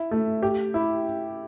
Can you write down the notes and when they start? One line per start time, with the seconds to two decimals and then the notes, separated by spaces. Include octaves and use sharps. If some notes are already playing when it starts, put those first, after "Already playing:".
Already playing: E4
0.11 A3
0.43 G4
0.74 E4